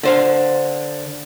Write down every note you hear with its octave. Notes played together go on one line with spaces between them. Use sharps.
D3 C5 F5